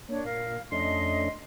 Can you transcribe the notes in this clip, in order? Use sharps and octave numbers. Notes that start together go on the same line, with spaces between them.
A#3 D4 C#5
A#2 A#4 F5
F2 A3 C#4 D4 D#5 C6